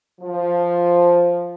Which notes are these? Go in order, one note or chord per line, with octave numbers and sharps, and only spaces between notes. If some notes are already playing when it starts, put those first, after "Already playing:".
F3